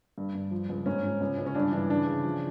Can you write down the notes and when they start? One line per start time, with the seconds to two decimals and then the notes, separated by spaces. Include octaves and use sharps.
0.18 G2
0.35 G2
0.51 F3
0.69 C#2
0.86 G#2 C#4
1.03 G#2
1.21 C#2
1.38 C#2
1.46 C#4
1.55 G2 D4
1.72 E3 D4
1.90 C#3 D4
2.07 C#3
2.24 F3